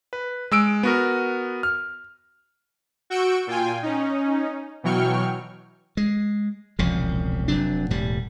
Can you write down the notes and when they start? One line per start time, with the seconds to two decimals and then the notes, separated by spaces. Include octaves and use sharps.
0.13 B4
0.51 G#3 E6 D7
0.83 B3 F#4 A#4
1.63 F6
3.10 F#4 C#6 E6 G6 D7
3.47 A#2 F4 G5 G#5
3.83 C#4 D#4
4.83 B2 E3 F#3 G5 C#6 F6
5.97 G#3
6.79 E1 C2 C#3 F3
7.48 F1 C3 F#3 D4
7.90 E1 A2 G3